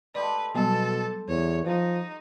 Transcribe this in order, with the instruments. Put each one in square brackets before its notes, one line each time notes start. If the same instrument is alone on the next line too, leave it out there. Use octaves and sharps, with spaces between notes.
[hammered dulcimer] G#3 G4 A4 [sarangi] B4 [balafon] D5
[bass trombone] B2 [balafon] F#3 G3 B3 [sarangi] A4 [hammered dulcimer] A5
[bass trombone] E2 [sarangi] C#5
[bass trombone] F3 [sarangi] D#4